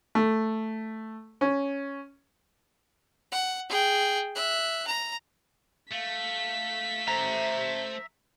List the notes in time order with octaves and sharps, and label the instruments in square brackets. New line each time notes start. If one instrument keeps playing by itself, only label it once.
[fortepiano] A3
C#4
[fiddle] F#5
G#4 G5
E5 F#6
A#5
[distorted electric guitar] A3 [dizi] F5 [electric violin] B6
[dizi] C5 [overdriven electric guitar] E5 A#5